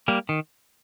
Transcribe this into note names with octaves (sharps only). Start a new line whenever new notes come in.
G3 A#3
D#3